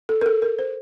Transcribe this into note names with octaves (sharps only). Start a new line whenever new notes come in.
A4
A#4
A4
A#4
C5